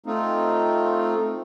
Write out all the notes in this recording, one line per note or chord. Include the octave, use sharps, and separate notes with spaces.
A3 C4 D#4 F4